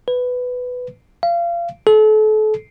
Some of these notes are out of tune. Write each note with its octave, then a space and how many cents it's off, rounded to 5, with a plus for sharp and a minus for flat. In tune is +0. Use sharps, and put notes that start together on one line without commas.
B4 +10
F5 -30
A4 -35